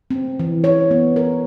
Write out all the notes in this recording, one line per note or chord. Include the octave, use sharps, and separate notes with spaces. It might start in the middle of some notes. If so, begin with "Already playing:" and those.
C4
E3
C#5
B3
A#4